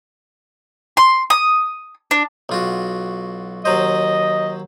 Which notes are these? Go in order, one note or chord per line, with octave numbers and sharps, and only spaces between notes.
C6
D#6
D4
B1 F4 F#4
D#2 F#3 C5 D#5